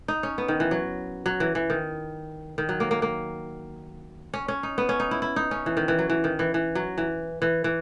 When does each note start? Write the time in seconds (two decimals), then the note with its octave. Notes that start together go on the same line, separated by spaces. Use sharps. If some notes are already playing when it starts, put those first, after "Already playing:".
0.08 D#4
0.23 C#4
0.38 B3
0.48 D#3
0.60 E3
0.71 F#3
1.26 F#3
1.40 E3
1.55 E3
1.70 D#3
2.58 D#3
2.69 F#3
2.80 A#3
2.91 A#3
3.02 A#3
4.34 C#4
4.48 C#4
4.63 D#4
4.78 B3
4.89 C#4
5.00 D#4
5.11 E4
5.22 E4
5.36 D#4
5.51 C#4
5.66 E3
5.77 D#3
5.88 E3
5.99 F#3
6.10 E3
6.24 D#3
6.39 E3
6.54 E3
6.75 F#3
6.98 E3
7.42 E3
7.64 E3